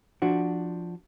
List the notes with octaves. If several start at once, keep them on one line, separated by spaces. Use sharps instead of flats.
F3 D4 F#4